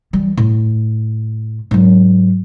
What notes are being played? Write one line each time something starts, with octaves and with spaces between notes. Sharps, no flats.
E3 G3
A2
G#2 F#3